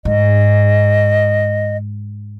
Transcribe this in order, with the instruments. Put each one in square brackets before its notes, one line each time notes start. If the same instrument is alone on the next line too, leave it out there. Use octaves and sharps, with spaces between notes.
[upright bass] G#2 [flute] D#5